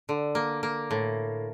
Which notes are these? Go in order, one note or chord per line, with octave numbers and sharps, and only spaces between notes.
D3
A#3
A#3
A2